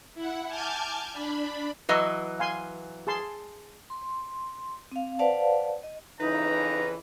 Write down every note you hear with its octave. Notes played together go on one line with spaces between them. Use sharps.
E4 F#5
G#5 A5 D6 F6 G6 G#6
D4 B5
E3 F#3 B4 D#5 A#5 C#6
F5 G#5 C6
G#4 A5 C6
C6
C4 F5
B4 C5 D5 F5 F#5 A5
D#5
F2 C#3 E3 D#4 B4 A#5